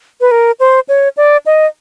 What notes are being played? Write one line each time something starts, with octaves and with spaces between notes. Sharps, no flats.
B4
A#4
C5
C#5
D5
D#5